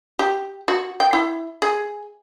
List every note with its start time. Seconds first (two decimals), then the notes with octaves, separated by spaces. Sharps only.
0.19 G4
0.68 F#4
1.00 G5
1.13 E4
1.62 G#4